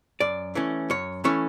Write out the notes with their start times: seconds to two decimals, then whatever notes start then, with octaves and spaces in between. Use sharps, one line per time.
0.20 F#2 D5
0.55 E3 A3 C#4
0.90 F#2 C#5
1.24 E3 A3 C#4 C#5